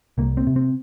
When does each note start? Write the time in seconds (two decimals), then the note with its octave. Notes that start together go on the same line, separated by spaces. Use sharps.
0.18 C2 A#3
0.37 C4
0.47 C3
0.56 C4